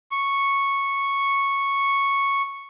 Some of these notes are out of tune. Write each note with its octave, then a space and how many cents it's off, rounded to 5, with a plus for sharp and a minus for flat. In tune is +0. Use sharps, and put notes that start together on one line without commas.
C#6 -5